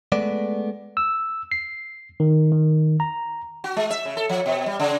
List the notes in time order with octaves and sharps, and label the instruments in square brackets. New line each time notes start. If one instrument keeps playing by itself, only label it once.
[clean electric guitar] G#3 A3 B3 D5
[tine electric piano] E6
C7
D#3
D#3
A#5
[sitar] F#4
G#3
E5
C#3
A4
F3
B2
G3
C#3